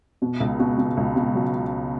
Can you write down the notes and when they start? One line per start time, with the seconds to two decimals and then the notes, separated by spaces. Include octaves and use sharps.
0.22 B2
0.40 C#2
0.60 B2
0.78 B2
0.97 C#2
1.16 B2
1.35 F#3